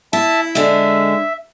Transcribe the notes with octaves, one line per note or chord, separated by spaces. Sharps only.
E4 E5 A5
D3 G#3 E5